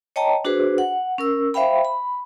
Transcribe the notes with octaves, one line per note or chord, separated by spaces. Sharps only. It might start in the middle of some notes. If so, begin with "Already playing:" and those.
C#5 D#5 G5 A5 A#5
D4 F#4 G#4 B4 C5
F#5
C#4 A#4 E6
C5 E5 F5 G5 B5
B5